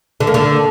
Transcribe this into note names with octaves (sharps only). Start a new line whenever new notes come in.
D3
A#3
D3